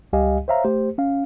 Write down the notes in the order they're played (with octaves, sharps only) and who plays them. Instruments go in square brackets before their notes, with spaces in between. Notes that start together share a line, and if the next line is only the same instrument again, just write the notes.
[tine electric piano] C#2 G3 G4 D#5 F5 G#5
C5 C#5 E5 F5 A#5
A3 G4 C5
C#4 F5